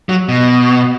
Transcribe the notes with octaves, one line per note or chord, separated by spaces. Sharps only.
F#3
B2